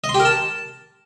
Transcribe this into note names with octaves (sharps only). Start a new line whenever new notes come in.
D#5
C6
G4
A#4
A5